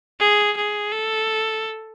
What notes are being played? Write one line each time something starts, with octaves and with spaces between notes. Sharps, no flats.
G#4
G#4
A4